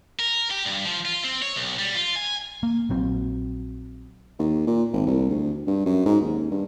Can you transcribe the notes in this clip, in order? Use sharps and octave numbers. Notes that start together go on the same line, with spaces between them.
A#4
G4
G2
F3
F4
C4
C#5
B1
G3
F4
G#5
A#3
A#1 F#3 C4
D#2
A#2
G#1
C2
D2
G2
F#2
G#2
D#2
G2